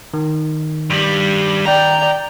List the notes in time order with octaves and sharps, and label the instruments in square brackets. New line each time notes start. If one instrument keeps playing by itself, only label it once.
[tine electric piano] D#3
[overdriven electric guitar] G2 G3
[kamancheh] D5 G5 [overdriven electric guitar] A#5